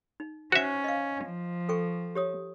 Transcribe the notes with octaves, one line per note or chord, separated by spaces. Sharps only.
D#4
C#4 F#4 C5 E5 F#5 C#6
D#5 F5
F3
A4 G5 C#6
G4 C#5 D#6